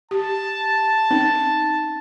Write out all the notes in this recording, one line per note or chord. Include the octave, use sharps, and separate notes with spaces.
G4 A5
C4 C#4 D#4